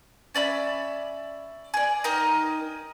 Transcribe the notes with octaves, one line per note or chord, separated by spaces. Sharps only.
C#4 D5 E5 B5
G#4 D5
D#4 A#4 D#5 G5